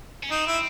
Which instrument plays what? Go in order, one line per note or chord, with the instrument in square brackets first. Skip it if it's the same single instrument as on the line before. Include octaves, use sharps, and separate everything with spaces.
[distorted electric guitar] C#4
[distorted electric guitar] C4 [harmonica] D#4
[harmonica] E4